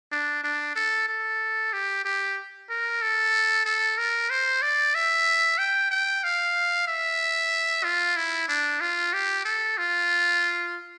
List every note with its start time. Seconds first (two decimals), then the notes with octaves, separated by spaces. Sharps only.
0.12 D4
0.44 D4
0.76 A4
1.09 A4
1.73 G4
2.05 G4
2.70 A#4
3.02 A4
3.66 A4
3.98 A#4
4.30 C5
4.62 D5
4.95 E5
5.58 G5
5.91 G5
6.24 F5
6.88 E5
7.84 F4
8.16 E4
8.49 D4
8.81 F4
9.13 G4
9.45 A4
9.78 F4